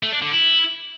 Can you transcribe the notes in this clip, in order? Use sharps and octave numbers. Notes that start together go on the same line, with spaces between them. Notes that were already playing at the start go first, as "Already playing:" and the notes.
A3
D4
D3
E4